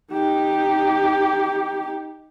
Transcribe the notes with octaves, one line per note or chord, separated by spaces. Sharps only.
D#4 G4